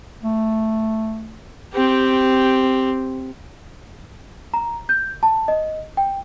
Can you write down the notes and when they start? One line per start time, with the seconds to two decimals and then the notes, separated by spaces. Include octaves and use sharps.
0.23 A3
1.74 C4 G4
4.54 A#5
4.89 G6
5.23 A5
5.48 D#5
5.97 G5